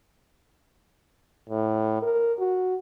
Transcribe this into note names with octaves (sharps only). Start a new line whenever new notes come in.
A2
A#4
F#4